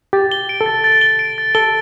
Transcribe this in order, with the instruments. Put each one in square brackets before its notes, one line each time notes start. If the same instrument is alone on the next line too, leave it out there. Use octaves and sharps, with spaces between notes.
[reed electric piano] G4 [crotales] A6
[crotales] G7
D7
[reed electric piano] A4
[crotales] A6
A6
G7
D7
A6
[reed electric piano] A4 [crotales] G7